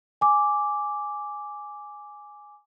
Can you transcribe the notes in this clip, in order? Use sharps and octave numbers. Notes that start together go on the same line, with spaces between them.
G#5 D6